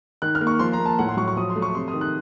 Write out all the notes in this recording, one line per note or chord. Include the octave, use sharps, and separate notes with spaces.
D#3 F#6
F6
A#3
C#6
F3 C6
A#5
A#3
A5
A2 F#5
C6
F#3 C#6
C#6
F3 D#6
C6
A3
C#6
C3 C6
D#6
D#3
F#6